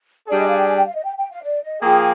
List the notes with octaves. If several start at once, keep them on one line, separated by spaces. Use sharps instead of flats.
G3 D4 G#4 D5
D#5
F5
G5
G#5
G5
F5
D#5
G5
G5
F5
D5
D#5
F3 A#3 F4 G#4 G5